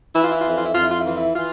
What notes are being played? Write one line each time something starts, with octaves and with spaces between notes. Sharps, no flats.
E3 E4
F4
E4
F4
F2 E4
F4
E4
F2 F4
E4
F4
E4
E3 F4
E4
E3 F4